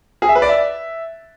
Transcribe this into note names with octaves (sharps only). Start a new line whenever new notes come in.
G#4
E5
B4
D5
E5